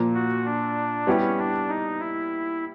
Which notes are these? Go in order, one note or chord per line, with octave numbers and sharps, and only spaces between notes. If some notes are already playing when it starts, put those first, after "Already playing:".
Already playing: A#2 F3 A#3
F#4
D4
G3 B3 C#4 E4 G4
D4
D#4
E4